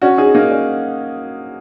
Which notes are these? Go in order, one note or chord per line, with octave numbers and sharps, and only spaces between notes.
C#4 F#4
D#4 G#4
A#3 D#4
C#4